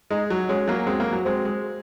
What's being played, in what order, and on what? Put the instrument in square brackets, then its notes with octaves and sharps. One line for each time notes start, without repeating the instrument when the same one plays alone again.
[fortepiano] G#3 [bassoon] D#4
[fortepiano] F#3
[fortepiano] G#3 [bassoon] C#4
[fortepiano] F#3 A#3
G#3 C4
F#3 A#3
F#3
[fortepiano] G#3 [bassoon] C4
[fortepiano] G#3